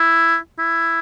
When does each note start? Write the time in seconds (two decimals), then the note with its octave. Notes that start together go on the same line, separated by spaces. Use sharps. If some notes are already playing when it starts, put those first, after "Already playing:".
Already playing: E4
0.58 E4